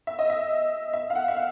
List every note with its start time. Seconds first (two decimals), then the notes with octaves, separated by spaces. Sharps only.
0.07 E5
0.19 D#5
0.30 E5
0.93 E5
1.10 F5
1.15 F#5
1.28 E5
1.36 F5